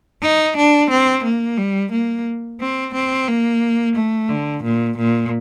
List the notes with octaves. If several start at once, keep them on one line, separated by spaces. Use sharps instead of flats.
D#4
D4
C4
A#3
G3
A#3
C4
C4
A#3
A3
D3
A#2
A#2